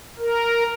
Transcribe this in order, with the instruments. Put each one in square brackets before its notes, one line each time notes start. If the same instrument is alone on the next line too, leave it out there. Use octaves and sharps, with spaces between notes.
[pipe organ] A#4